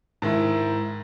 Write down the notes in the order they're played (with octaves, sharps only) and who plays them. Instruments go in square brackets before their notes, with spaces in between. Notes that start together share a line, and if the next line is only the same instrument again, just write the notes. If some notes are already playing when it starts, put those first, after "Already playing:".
[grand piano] G#2 D#3 E4